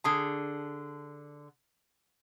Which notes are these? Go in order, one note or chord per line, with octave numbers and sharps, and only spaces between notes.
D3 G#4 A5